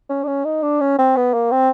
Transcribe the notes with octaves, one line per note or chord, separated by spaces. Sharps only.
C#4
D4
C#4
D#4
D4
C#4
C4
B3
A#3
C4